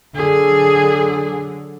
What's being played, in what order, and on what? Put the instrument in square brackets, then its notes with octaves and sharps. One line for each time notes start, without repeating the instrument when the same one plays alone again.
[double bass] D3 F#3 [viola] G#4